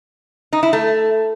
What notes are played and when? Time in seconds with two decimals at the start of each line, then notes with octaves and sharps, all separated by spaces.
0.53 D#4
0.63 E4
0.73 A3